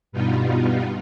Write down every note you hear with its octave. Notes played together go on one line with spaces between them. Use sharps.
G2 B2 G3 B3 D#4 F4